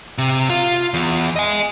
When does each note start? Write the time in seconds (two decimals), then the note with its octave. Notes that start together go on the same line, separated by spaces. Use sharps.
0.18 C3
0.50 F4
0.94 E2
1.36 D#5 G#5